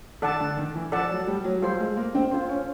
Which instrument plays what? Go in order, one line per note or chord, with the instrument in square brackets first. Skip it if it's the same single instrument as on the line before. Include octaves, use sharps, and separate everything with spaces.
[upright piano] D#3 [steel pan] A4 D5 F#5 A5
[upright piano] D3
D#3
E3
[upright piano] F3 [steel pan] A4 D5 F#5 A5
[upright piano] F#3
G3
F#3
[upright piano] G3 [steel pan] F4 A4 C5
[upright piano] G#3
A#3
C4
[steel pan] F4 A4 C5
[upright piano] C#4